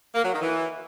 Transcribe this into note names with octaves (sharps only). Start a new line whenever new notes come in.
A#3
F#3
D#3
E3